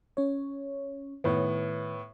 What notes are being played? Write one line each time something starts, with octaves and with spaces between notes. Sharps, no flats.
C#4 C#5
A2 D#3 B3 C#5